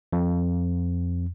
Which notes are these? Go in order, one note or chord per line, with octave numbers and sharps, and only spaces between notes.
F2